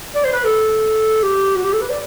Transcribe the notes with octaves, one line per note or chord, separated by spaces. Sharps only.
D5
C5
B4
A4
G4
F#4
G4
A4
B4
D5